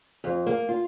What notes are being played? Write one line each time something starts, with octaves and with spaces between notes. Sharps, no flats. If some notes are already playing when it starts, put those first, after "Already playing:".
F2
A#3
F4